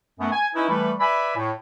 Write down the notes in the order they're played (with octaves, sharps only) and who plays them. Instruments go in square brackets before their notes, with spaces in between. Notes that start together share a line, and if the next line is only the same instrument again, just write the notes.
[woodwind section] F#2 A3 B3
G#5
C#4 D#4 E4 B4
E3 G3 A3 B4
B4 D5 E5 G#5 B5
A2